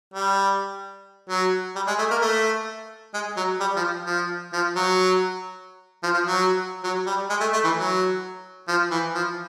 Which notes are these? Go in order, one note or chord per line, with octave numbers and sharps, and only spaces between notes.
G3
F#3
G3
G#3
A3
A#3
A3
G#3
F#3
G3
F3
F3
F3
F#3
F3
F3
F#3
F#3
G3
G#3
A3
A3
E3
F#3
F3
E3
F3